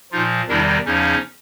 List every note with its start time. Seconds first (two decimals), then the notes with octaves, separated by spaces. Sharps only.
0.11 A#2 F3 D#4 F4
0.48 E2 C3 D#3 G3 D4 E4
0.85 E2 C#3 F3 C#4 D#4